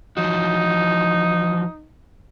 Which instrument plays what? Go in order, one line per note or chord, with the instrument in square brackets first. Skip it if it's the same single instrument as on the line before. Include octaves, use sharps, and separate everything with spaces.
[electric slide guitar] E3 F3 F#4 [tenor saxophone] D#4